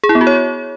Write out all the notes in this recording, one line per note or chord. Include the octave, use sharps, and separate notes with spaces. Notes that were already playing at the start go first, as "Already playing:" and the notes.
G#4
E4
B3
F#4
C#5